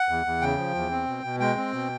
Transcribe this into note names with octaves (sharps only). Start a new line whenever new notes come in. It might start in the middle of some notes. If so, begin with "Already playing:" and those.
Already playing: F#5
E2
E2
C#3 G5
F3
E2
C4
B2
B2
G#3 G5
C4
B2